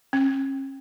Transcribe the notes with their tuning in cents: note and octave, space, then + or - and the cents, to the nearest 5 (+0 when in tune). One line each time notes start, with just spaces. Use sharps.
C#4 -35